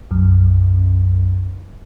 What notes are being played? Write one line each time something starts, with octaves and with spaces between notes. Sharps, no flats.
B1 F#2